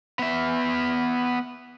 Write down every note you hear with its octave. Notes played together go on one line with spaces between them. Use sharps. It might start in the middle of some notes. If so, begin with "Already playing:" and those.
B3 E5